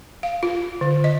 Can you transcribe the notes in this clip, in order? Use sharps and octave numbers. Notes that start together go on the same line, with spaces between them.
F5
F4
D3
D#5